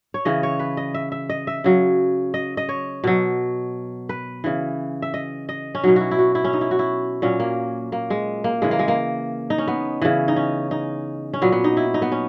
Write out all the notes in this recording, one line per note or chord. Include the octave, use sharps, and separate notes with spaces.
C#5
C#3 E3 D#5
C#5
B4
D#5
E5
E5
D#5
E5
C#3 F#3
D#5
D#5
C#5
B2 F#3
B4
C#3 E3
E5
D#5
D#5
C#4
B2 F#3 D#4
E4 F#4
E4
F#4
E4
C#4
D#4
E4
F#4
E4
A#2 F#3 C#4
A#3
A#3
G#3
A#3
C#3 E3 G#3
A#3
G#3
A#3
D#4
C#4
B3
C#3 E3
D#4
C#4
D#4
C#4
A#2 F#3 B3
B3
D#4
E4
D#4
B3
C#4